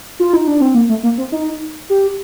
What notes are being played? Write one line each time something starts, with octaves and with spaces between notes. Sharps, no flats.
F4
D#4
D4
C4
A#3
A3
A#3
C4
D#4
G4